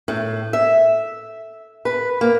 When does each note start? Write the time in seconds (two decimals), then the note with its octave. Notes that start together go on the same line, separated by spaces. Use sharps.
0.08 A2
0.53 E5
1.85 B4
2.21 A#3